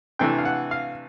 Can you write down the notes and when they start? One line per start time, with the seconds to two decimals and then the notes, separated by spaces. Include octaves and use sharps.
0.19 C3 E3 A3 D4 G5
0.38 F5
0.45 F#5
0.71 F5